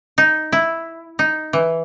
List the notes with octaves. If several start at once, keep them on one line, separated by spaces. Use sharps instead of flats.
D#4
E4
D#4
E3